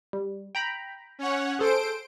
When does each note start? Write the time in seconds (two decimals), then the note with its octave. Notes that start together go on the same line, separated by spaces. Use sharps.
0.13 G3
0.55 G5 A#5 B5
1.19 C#4 C#5 F#5
1.59 G#4 A4 C5 D7